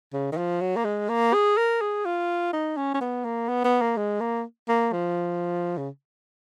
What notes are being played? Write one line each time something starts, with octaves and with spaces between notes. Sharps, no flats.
C#3
D#3
F3
F#3
A#3
G#3
A#3
G#4
A#4
G#4
F4
D#4
C#4
C#4
B3
A#3
B3
B3
A#3
G#3
A#3
A#3
F3
C#3